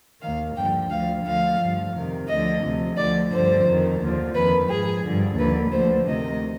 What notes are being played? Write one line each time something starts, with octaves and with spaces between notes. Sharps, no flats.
D#2 D#3 F5
G2 D3 F3 G5
D2 D3 F3 F5
D2 D3 F3 F5
G2 F3
F2 C3 D#3
D2 D3 F3 D#5
D2 C3 F3
D2 D3 F3 D5
G2 D3 F3 C5
F2 D#3
D#2 D3 F3
F2 D#3 B4
G#2 F3 G#4
G2 D3 F3
D#2 D3 F3 B4
D2 D3 F3 C5
D2 C3 D#3 D#5